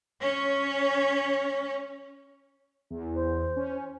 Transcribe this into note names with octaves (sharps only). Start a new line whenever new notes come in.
C#4 C#5
E2
C5
C#4